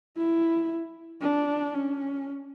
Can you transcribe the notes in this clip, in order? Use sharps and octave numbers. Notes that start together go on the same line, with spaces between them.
E4
D4
C#4